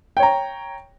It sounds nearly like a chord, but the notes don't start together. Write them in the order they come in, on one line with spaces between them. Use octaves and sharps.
G5 C#5 A#5